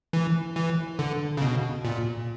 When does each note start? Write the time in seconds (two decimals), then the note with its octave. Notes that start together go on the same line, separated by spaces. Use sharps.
0.13 E3
0.56 E3
0.99 D3
1.37 C#3
1.42 B2
1.85 A#2